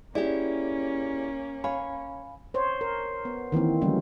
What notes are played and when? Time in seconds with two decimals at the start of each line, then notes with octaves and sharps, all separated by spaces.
0.15 A#3 C#4 E4 G4 G#4 D5
1.64 C#5 F5 G#5 B5
2.54 C5 C#5
2.81 A#4
3.25 B3
3.52 D#3 E3 A#3 C4
3.81 D3 E3 F#3 G3 A3 C#4